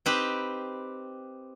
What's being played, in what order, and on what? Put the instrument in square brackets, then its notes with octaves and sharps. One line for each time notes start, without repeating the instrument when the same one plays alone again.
[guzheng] C4 D#4 G4 B4